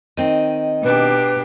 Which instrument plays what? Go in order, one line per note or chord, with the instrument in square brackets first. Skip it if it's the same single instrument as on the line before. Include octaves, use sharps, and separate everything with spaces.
[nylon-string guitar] D#3 C4 [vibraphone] D#5
[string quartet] B2 D4 G4 [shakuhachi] B4